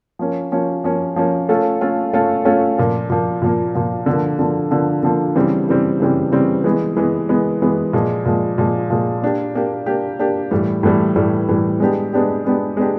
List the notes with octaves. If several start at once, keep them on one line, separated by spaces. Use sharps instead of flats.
F3 A#3 C#4
F3 A#3 C#4
F3 A#3 C#4
F3 A#3 C#4
A3 C#4 F4 A4
A3 C#4 F4 A4
A3 C#4 F4 A4
A3 C#4 F4 A4
A#2 F3 A#3
A#2 F3 A#3
A#2 F3 A#3
A#2 F3 A#3
D3 F3 A#3
D3 F3 A#3
D3 F3 A#3
D3 F3 A#3
C#3 E3 G3 C4
C#3 E3 G3 C4
C#3 E3 G3 C4
C#3 E3 G3 C4
E3 G#3 B3
E3 G#3 B3
E3 G#3 B3
E3 G#3 B3
A#2 F3 G#3
A#2 F3 G#3
A#2 F3 G#3
A#2 F3 G#3
A#3 D4 G4
A#3 D4 G4
A#3 D4 G4
A#3 D4 G4
A2 E3 G3
A2 E3 G3
A2 E3 G3
A2 E3 G3
G#3 B3 D4 G4
G#3 B3 D4 G4
G#3 B3 D4 G4
G#3 B3 D4 G4